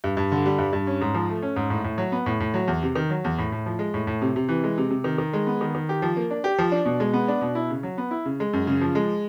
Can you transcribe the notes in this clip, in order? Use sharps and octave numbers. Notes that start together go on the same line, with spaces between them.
G2
G2
D3
G3
G2
G2
C#4
G#2
F3
A3
C#4
G#2
A2
A2
F#3
B3
A2
A2
F#3
E2
C3
D#3
F#3
E2
A2
A2
F3
G#3
A2
A2
C3
C3
E3
G#3
C3
C3
D#3
D#3
G#3
B3
D#3
D#3
G4
F3
A#3
D4
G4
F3
D4
B2
G#3
B3
D4
B2
E4
C#3
F#3
B3
E4
C#3
G#3
F#2
C#3
F3
G#3